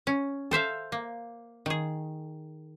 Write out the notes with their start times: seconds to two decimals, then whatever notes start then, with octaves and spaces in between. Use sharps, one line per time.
0.07 C#4
0.51 A4 C5 E5 F5
0.92 A#3
1.66 D#3 G#4